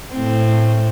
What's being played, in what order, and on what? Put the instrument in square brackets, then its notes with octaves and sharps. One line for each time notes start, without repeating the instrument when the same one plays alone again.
[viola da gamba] A2 C4